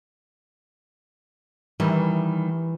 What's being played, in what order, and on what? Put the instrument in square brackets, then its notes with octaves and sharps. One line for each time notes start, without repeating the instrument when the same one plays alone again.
[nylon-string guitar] D#3 G3 [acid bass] E3